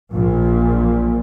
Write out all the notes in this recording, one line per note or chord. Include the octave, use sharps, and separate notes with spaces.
A#1 A#2